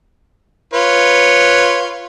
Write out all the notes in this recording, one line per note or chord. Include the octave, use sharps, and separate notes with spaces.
F4 B4 C#5